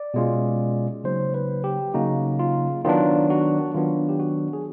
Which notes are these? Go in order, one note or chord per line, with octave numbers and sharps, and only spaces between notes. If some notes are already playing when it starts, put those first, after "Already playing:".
Already playing: D5
B2 G#3 C#4 F4
C#3 F#3 A#3 D#4 C5
B4
G4
C#3 F#3 A#3 D#4 F#4
F4
D#3 F#3 B3 D4 F4
F#4
D#3 F#3 B3 D4 F4
G4
F#4
G#4